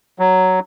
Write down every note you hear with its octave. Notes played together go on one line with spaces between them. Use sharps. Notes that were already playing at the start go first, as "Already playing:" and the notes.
F#3